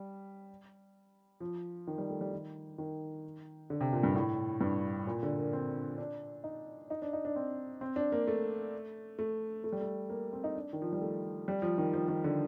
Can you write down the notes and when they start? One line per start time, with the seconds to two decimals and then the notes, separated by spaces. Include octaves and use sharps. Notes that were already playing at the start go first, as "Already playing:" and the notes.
Already playing: G3
1.40 F3
1.87 D#3
1.98 G3
2.09 A3
2.21 G3
2.33 D#3
2.78 D#3
3.70 D3
3.81 C3
3.93 A#2
4.03 G2
4.15 A2
4.61 G2
5.07 A#2
5.23 D3
5.38 A#3
5.53 C4
5.98 D4
6.44 D#4
6.90 D#4
7.02 D4
7.13 D#4
7.25 D4
7.36 C4
7.81 C4
7.96 D4
8.12 A#3
8.27 A3
9.19 A3
9.64 A3
9.72 G3
9.81 A3
10.10 A#3
10.33 C4
10.44 D#4
10.55 D4
10.73 D#3
10.82 F3
10.93 G3
11.01 A3
11.48 G3
11.62 F3
11.78 D#3
11.93 F3
12.08 D#3
12.24 D3